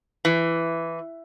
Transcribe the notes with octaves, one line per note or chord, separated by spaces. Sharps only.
E3